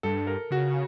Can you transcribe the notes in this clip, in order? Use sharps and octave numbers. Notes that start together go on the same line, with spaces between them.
G2 A4
A#4
C#3 F#4